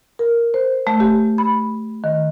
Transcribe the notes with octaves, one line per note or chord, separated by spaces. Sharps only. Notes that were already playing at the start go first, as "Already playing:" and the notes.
A#4
C5
A3
G4
B5
D#3